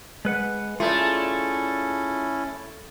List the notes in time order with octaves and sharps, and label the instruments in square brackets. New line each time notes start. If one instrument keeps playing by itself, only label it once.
[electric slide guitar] G#3 B4 F#5
[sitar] A3 [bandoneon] C#4 E4 [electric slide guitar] F4 G#4 D5